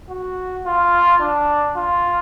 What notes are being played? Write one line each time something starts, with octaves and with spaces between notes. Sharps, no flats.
F#4
F4
D4
F4